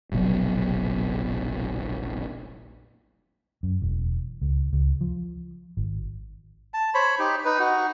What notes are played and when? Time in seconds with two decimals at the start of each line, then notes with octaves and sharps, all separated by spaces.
0.12 F1 A#1 B2 F#3
3.63 F#2
3.82 E1
4.42 C#2
4.73 C#2
5.01 F3
5.77 G#1
6.74 A5
6.94 C5 C#5 B5
7.19 D#4 G4
7.45 D#4 B4
7.59 D#4 F#4